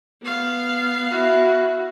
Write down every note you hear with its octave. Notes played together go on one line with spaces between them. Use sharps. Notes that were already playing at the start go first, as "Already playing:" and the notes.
B3 F5
E4 F#4